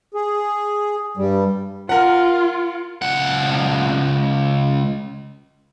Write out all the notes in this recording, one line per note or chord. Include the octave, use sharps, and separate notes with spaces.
G#4
G2 G3
F4 A#4 F#5
C#2 F#5